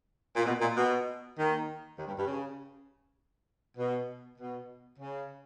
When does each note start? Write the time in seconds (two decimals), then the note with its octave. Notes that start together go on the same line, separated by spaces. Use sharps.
0.36 A#2
0.46 B2
0.61 A#2
0.76 B2
1.37 D#2 D#3
1.97 D#2 D#3
2.07 G2 G3
2.17 G2 G3
2.27 C#3
3.78 B2
4.39 B2
4.98 C#3